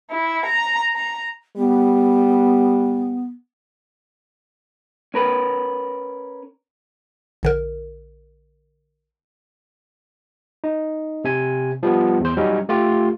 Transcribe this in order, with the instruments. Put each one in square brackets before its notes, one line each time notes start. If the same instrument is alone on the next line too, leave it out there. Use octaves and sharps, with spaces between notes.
[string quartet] E4
A#5
A#5
[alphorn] G3 [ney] B3
[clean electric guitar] C#4 A#4 B4
[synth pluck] A#1 D3 A#4
[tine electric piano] D#4
C3 G#5
F3 G3 B3
E2 C5
F#3 G3 C#4 D#4
A3 F4 G4